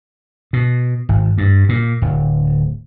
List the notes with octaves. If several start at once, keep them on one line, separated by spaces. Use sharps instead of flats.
B2
G#1
G2
A#2
D1